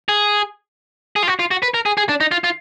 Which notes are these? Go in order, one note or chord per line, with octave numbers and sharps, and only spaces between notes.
G#4
G#4
F4
F#4
F4
F#4
B4
A#4
G#4
G#4
D4
D#4
F4
F4